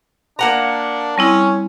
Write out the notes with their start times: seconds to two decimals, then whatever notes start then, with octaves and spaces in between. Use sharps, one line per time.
0.39 A#3 D4 F#5 A#5
1.18 G3 C4 C#4 E4